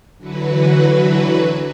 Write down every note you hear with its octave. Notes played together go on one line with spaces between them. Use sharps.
D3 E3 F#3 F#4 B4